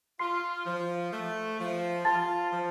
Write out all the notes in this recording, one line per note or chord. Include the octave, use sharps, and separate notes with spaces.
F4 C6 C7
F3
A3
F3
F4 A5 A6
F3